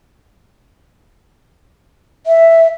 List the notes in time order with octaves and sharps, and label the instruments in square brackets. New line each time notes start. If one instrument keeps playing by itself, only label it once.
[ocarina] E5